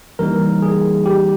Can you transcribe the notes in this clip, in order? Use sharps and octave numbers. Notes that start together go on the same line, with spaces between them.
E3 G3 A#3 D#4 A#4
G#4
G4